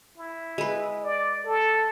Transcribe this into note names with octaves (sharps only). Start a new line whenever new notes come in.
E4
G#3 B4
D5
A4